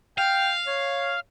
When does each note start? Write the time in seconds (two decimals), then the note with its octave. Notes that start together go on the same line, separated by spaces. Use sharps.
0.18 F5 G5
0.67 C#5